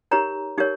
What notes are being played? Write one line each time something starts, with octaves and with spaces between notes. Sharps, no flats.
D#4 G4 A#4 C#5 A#5
D#4 G4 A#4 C#5